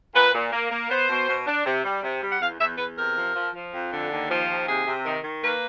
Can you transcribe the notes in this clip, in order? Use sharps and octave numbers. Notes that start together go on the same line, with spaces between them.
A#2 B4
A#2
A#3
A#3
B3 C5
B2
B2
D4
C3
G3
C3
G3
F#5
E2 F5
E2 E5
E2 B4
C3 A#4
F3
F3
F3
F2
D3
D#2
F3
D#2
C3 G#4
C3
D#3
D#3
A#3 B4